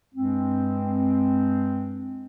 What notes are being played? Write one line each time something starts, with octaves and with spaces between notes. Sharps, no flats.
G2 G#3 C4